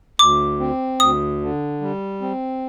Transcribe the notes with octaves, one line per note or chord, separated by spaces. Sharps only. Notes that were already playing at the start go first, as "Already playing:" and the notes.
D2 D6
C4
D2 D#6
D3
G3
C4